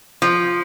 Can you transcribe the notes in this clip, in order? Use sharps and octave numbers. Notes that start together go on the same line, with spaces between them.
F3